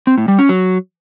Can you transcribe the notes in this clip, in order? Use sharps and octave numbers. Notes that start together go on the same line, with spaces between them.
C4
A2
G3
C#4
F#3